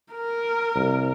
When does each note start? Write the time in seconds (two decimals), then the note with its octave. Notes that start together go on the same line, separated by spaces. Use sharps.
0.13 A#4
0.75 C2